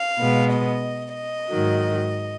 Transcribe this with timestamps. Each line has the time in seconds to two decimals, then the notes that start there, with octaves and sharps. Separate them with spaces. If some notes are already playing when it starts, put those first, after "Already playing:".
Already playing: F5
0.19 B2 G#3 B3
0.51 D#5
1.16 D#5
1.49 G#2 D#3 F#3